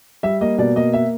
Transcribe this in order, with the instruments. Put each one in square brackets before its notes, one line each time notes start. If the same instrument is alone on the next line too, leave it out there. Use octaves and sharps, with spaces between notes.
[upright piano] G3 E5
A#3 D#5
B2 D5
A#3 D#5
E5